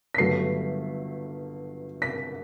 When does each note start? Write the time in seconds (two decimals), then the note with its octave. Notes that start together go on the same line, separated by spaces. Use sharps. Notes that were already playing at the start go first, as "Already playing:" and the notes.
0.14 B6
0.18 G1 G2 F#3 A3 C7
2.02 B6